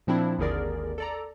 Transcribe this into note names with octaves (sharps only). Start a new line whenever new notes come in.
A#2 F3 C4 D4 E4
G#1 D#2 D3 G#4 A#4 D5
A4 D5 A#5